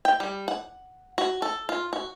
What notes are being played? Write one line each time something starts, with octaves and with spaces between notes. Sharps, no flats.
G5
G3
F#5
F#4
A4
F4
F#4